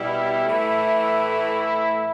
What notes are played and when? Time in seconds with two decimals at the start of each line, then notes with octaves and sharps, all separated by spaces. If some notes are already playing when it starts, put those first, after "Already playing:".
Already playing: B2 G3 E4
0.45 A2 E3 A3